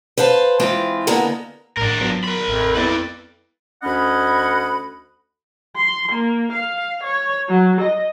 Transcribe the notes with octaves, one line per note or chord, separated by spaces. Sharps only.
B4 C5 F5 A5
E3 G#3 C4 F4
D3 G#3 A#3 B3
G#1 A2 D4 A#4
F#3 B3 F4
A#4 B5
A1 F2 E5
B3 E4 B4 D5 E6
D2 C#4 D#5 F#5 B5
C6
A#3
F5
C#5
F#3
D#5